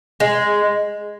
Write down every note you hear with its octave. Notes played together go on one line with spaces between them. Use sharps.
G#3